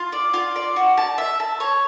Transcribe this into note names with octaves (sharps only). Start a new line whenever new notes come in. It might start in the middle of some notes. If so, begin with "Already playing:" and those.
Already playing: F4
D5
F4
D5
F#4
A5
E5
A5
C#5